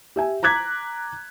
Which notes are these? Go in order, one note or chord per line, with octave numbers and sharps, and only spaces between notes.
G4 E5 G#5
A#5 D6 F#6 G#6 B6